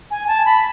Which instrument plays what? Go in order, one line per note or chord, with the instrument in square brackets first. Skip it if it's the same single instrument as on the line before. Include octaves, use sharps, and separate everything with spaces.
[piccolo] G#5
A5
B5